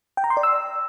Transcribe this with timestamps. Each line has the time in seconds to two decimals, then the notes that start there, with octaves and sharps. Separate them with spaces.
0.17 G5
0.24 A#5
0.30 C6
0.37 D5
0.43 E6